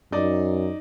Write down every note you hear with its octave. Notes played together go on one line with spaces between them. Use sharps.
F#2 D#4 D5